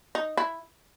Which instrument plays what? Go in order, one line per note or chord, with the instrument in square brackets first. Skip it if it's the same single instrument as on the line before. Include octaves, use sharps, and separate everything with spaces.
[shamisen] D#4
E4